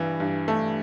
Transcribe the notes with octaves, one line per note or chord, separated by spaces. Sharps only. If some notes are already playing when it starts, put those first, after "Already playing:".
Already playing: G2 E3
G2
A3